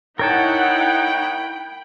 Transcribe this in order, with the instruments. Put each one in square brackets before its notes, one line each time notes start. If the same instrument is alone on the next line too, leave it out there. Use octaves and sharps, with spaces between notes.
[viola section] D#4 E4 F#5 [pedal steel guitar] A#4 C#5 A5 [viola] G5 B5